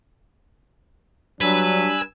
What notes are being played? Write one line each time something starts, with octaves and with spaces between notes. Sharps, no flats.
F#3 G3 D4 B4 G#5 E6